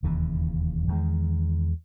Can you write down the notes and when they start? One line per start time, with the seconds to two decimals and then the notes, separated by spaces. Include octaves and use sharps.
0.03 E1 D#2 C#3 E3
0.87 E2 D#3 G#3